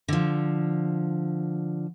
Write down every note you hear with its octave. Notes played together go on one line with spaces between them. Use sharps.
D3 F3